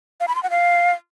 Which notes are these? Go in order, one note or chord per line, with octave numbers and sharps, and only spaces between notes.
F5
B5
C6
F#5
F5